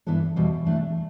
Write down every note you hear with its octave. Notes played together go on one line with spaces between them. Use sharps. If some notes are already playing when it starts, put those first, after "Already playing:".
G2 E3 B3 D4 A4
E2 B2 G3 C4
E3 A3 D4 A4